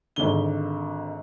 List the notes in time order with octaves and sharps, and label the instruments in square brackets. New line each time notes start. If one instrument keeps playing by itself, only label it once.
[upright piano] G#1 G#2 D3 G7